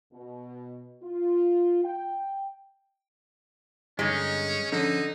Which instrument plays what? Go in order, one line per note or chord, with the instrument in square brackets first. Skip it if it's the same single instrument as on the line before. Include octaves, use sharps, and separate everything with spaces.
[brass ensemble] B2
F4
G5
[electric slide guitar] G2 D3 [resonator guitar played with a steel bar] G#3 D#4 [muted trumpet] C#4
[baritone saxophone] D3 [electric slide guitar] F3 C#4 C#5 [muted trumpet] D#4